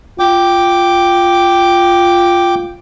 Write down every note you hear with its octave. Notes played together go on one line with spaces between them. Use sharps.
F4 G5 D6